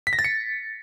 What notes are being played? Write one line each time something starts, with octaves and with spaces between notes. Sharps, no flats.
B6
A#6
A6
C#7